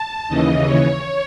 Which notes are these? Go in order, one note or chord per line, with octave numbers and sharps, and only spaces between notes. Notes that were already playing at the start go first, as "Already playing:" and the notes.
Already playing: A5
D#2 C#3 E3 D#5
C#5